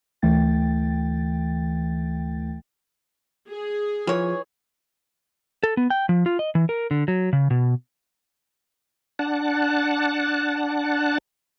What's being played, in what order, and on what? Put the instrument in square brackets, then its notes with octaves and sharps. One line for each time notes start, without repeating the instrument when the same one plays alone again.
[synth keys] D2 E3 A3 G5 A6
[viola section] G#4
[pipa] E3 C#5 [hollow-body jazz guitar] F3
[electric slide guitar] A4
B3
G5
F3
F4
D#5
E3
A#4
D3
F#3
C#3
B2
[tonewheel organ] D4 F#5 A5